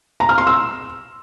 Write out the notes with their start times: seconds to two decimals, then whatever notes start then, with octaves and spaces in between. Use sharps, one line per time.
0.20 A#5
0.29 F6
0.38 C6
0.47 E6